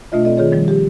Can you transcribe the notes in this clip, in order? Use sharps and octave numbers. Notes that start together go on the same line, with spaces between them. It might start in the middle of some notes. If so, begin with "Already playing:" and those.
B2 A3 D4 F4 D#5 E5
C4 A4 D5 D#5
D#3 F4 G#4 C#5
D#3 F3 G3
G4